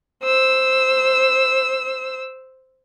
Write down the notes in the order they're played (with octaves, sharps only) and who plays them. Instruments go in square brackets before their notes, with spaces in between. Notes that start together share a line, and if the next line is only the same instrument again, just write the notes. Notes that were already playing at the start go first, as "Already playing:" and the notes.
[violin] C5 E6